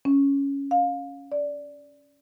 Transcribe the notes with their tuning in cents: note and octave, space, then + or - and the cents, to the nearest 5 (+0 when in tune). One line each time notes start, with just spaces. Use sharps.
C#4 +5
F5 +20
D5 -10